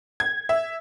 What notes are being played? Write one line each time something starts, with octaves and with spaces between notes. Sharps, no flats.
G#6
E5